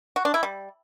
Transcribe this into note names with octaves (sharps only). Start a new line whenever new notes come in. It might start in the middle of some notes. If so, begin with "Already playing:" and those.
F#4
D4
E4
G3